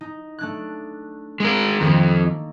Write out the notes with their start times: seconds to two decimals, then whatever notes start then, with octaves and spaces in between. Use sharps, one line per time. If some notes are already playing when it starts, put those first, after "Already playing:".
0.01 D#4
0.39 A3 D4 F#6
1.40 G#3 A#4
1.81 F2 D#3 A3 A#3